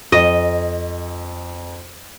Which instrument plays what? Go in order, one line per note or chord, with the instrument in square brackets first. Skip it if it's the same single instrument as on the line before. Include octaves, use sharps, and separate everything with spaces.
[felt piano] F2 [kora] D#5